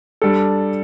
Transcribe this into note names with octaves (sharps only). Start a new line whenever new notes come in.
G3 D4 A4